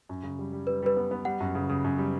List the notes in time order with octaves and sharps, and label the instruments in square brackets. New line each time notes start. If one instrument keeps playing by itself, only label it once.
[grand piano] F#2
C#3
G3
G3
[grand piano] G3 [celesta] B4
[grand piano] G3 [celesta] B4
[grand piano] B3
B3
[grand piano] G3 [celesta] F#5
[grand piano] F#2
C#3
C#3
F#2
G3